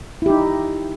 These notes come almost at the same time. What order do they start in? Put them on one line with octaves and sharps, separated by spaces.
E4 G4 D#4